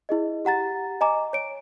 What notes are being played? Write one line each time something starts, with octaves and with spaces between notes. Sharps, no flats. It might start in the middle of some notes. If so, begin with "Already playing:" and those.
E4 G#4 D#5
G4 F#5 A#5 A6
D#5 G#5 A#5 D6
C#5 D7